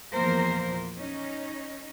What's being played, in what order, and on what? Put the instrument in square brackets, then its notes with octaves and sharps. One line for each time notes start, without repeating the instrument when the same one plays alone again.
[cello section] E2 A#2 F3 A#3 A#4 C5
C#4 D#4